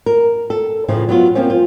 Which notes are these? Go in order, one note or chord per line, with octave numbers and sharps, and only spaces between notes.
A#4
A4
A2 C#3 E3 F3 A3
F#3 B3 F4
F3 A#3 C4 C#4
F4